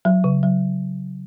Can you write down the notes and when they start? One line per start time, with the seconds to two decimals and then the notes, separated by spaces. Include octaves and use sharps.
0.05 F#3
0.24 C#3
0.43 F#3